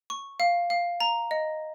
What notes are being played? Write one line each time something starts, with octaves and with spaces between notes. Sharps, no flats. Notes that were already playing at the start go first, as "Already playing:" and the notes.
C#6
F5
F5
A#5
D#5